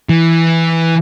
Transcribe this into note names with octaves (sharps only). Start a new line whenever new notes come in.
E3